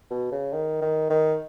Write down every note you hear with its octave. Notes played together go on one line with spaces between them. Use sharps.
B2
C#3
D#3
D#3
D#3